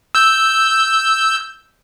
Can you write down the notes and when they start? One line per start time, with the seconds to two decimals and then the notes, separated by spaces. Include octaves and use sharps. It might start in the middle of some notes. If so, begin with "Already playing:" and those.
0.15 E6 G6